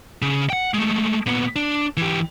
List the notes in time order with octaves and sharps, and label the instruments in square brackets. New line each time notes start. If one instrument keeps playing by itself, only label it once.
[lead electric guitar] C#3
F#5 G5
G#3 A3
A#2 B3
D4
E3 G4